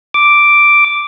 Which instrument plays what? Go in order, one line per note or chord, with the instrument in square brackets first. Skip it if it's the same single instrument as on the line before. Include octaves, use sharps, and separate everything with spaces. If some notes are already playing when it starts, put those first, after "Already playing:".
[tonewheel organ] D6